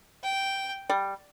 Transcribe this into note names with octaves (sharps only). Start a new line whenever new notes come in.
G5
G3